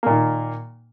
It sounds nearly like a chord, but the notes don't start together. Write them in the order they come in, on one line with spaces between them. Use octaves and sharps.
A#3 A#2 D#3